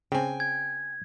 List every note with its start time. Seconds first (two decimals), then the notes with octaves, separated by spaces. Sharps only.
0.12 C#3 C4 G5 G#5
0.40 G#6